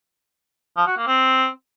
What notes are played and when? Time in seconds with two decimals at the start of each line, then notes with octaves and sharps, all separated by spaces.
0.77 F3
0.87 F#4
0.97 A#3
1.07 C4